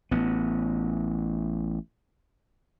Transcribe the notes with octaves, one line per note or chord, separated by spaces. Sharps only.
A1 B3